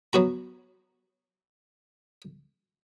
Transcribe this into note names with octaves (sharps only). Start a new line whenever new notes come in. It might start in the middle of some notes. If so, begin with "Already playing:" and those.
F#3 B3 F#4 A#5